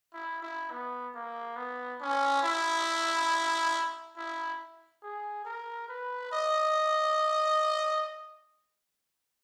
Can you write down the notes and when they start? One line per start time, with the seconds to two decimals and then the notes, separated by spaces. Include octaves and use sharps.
0.13 E4
0.42 E4
0.71 B3
1.14 A#3
1.56 B3
2.01 C#4
2.43 E4
4.16 E4
5.03 G#4
5.45 A#4
5.88 B4
6.32 D#5